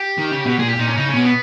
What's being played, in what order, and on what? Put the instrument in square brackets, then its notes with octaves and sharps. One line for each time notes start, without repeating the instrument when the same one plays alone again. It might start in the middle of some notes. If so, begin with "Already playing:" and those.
Already playing: [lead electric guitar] G4
[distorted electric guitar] D#3
C#3
B2
[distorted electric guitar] A#2 [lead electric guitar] G#4
[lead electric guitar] G4
[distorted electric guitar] A#2 [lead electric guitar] D#4
[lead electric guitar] C#4
[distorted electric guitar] C#3 [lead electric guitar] D#4
[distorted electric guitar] A#2 [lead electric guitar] C#4
[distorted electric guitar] B2
[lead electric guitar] B3